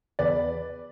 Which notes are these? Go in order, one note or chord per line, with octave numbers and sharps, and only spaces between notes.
E2 B4 D5